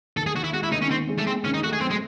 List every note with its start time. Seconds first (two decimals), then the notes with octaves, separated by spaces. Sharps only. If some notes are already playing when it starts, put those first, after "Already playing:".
0.17 D#2 A4
0.26 G#4
0.34 D#2 F#4
0.44 E4
0.53 G#3 F#4
0.63 E4
0.72 D#2 D#4
0.81 C#4
0.90 D#3 C4
1.08 G#3
1.18 A3
1.26 G#3 C4
1.44 D#2 C#4
1.54 D#4
1.63 A3 F#4
1.73 G#4
1.81 F#2 C4
1.90 G#3